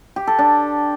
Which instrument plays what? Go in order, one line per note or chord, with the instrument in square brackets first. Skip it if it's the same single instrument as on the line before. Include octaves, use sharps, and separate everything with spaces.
[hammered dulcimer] G4
A4
D4